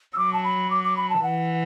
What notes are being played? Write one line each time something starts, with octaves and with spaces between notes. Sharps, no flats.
E6
F#3 D6
A5
B5
D6
D6
B5
A5
E3 F#5